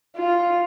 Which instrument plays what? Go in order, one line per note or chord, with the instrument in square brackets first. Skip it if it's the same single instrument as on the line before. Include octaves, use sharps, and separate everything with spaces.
[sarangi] F4